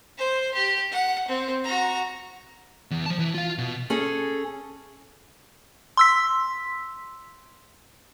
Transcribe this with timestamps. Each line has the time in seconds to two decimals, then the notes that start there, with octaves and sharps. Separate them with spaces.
0.18 C5
0.54 G4
0.91 F#5
1.28 C4
1.64 F#4 A#5
2.91 E2
3.06 F3 A5
3.19 E3 E4
3.34 F4 F5
3.58 B2
3.90 C#4 G#4 A4
5.97 C6 E6 B6